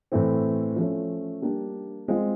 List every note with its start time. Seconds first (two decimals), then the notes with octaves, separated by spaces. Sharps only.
0.12 A2 E3 A3 C4
0.76 F3 A3 C#4
1.42 G3 A#3 D4 G4
2.08 G#3 C4 F4